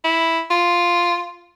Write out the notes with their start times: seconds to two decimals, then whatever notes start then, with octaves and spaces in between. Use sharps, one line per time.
0.04 E4
0.51 F4